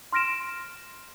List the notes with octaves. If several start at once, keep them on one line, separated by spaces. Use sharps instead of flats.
C6 F6 A#6 D7 E7